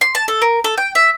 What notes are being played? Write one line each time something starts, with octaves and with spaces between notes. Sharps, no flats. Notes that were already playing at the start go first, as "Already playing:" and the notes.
C6
A5
A4
A#4
A4
G5
E5